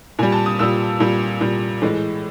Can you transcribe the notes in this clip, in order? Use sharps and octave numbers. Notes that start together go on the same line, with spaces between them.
A#2 G3 G#5
A5
D#6
A#2 G3 E6
A#2 G3
A#2 G3
A2 E3 G#3